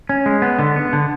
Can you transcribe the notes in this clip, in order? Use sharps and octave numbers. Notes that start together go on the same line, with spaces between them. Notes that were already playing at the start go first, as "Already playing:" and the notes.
C#4
G#3
B3
D3
B3
D3